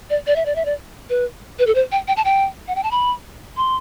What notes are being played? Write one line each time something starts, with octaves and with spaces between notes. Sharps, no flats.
D5
D5
E5
D5
E5
D5
B4
B4
A4
C5
G5
G5
A5
G5
F#5
G5
A5
B5
C6